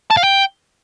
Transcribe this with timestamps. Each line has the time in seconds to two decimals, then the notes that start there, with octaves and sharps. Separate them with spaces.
0.10 A5
0.17 F5
0.24 G5